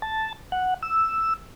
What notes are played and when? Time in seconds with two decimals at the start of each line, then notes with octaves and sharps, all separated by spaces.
0.02 A5
0.52 F#5
0.82 E6